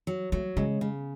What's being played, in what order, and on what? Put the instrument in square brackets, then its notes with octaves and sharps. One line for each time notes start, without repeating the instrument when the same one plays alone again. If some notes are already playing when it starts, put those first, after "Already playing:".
[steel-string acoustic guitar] F#3
[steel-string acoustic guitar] F#3 [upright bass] A3
[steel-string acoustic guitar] C#3 [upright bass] G#3
[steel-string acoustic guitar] C#3